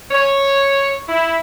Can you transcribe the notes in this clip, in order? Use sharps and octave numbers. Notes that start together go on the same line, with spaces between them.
C#5
E4